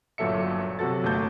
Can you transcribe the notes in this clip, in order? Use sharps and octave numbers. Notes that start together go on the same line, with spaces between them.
G1 A#2 F#3 A4 E5 C#7
C3 F#3 F#4 A4 A6
G1 A3 A#3 A5 G6